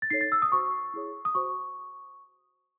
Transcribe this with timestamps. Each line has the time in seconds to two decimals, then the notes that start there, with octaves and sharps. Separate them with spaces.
0.02 A6
0.10 D#4 A4 C#5 C7
0.21 A6
0.32 E6
0.42 D#6
0.52 F#4 C5 C#6
0.94 E4 G#4 C#5
1.25 D#6
1.35 F#4 C5 C#6